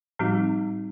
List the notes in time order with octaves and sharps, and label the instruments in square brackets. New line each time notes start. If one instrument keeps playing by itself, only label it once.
[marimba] A2 F3 G3 C4 D#4 F#4